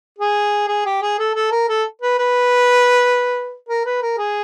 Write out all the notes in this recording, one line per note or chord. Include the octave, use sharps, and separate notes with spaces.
G#4
G#4
G4
G#4
A4
A4
A#4
A4
B4
B4
A#4
B4
A#4
G#4